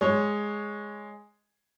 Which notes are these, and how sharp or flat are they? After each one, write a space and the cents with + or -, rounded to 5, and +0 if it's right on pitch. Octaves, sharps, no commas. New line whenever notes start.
G#3 +0 C#5 +0